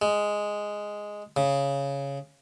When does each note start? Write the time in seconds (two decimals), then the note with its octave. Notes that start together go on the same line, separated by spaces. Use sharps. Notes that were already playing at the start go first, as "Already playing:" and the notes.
0.02 G#3
1.37 C#3